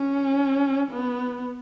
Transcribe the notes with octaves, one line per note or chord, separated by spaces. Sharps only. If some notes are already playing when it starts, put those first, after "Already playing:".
Already playing: C#4
B3